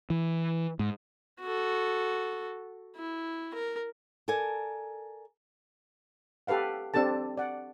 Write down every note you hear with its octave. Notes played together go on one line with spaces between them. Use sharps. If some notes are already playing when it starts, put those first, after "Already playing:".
E3
G#2
F#4 A4
E4
A#4
A4 A#4 D5 G#5 A5
G4 A4 B4 F5 F#5
C4 D4 G4 A4 A5
D5 F#5